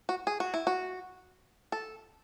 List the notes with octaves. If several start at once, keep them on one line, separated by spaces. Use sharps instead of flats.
F#4
G#4
F#4
E4
F#4
A4